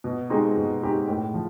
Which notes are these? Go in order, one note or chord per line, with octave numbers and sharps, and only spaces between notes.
B2
G#3 C4 D#4 G4
B2
G#3 C4 D#4 G4
A2
F3